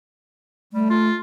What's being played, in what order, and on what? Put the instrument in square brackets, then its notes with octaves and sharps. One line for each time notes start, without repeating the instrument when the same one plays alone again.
[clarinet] G3 [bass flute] A3
[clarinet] F4